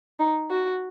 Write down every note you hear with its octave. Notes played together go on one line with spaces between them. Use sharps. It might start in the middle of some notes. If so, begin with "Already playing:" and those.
D#4
F#4